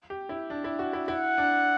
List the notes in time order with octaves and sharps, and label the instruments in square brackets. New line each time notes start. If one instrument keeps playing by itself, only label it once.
[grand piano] G4
E4
D4
E4
F#4
E4
[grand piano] E4 [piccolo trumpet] F#5
[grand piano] D4